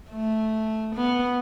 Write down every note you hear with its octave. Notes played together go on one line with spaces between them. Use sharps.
A3
B3